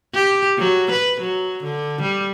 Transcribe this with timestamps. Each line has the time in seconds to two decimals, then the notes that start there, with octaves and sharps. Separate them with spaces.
0.14 G4
0.58 F#3
0.91 B4
1.21 F#3
1.64 D3
2.02 G3